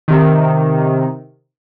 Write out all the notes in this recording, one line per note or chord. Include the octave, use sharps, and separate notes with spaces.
C3 D#3